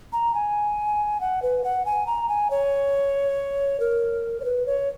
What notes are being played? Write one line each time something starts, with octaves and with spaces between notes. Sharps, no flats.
A#5
G#5
F#5
B4
F#5
G#5
A#5
G#5
C#5
A#4
C#5
B4
C#5